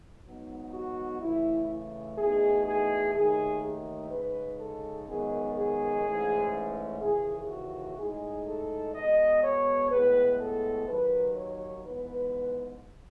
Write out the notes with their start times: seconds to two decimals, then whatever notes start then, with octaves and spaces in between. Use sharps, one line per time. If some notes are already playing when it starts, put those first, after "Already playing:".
0.24 G#2 F#3 B3 D#4
0.73 F#4
1.21 C#3 E3 A3 E4
2.18 E2 B2 A3 D#4 G#4
2.67 G#4
3.15 D#2 D#3 A3 D#4 G#4
4.11 C#3 G#3 D#4 B4
4.60 A4
5.08 F#2 D#3 G#3 B3 D#4 G#4
5.57 G#4
6.05 G#2 E3 A3 C#4
7.01 D#2 C#3 E3 G#4
7.50 F#4
7.98 A2 G#3 D#4 G#4
8.47 A4
8.95 B2 G#3 B3 D#5
9.42 C#5
9.91 A2 G#3 B3 B4
10.40 A4
10.88 D#2 D#3 F#3 B4
11.36 C#5
11.85 G#2 E3 B3 B4